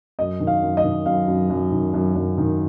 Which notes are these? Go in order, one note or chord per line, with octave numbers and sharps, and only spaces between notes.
F#2 D#5
D#3
F5
F#2
D#5
D#3
F#2 F5
F#2
F#2
D#3
F#2
F#2
D#3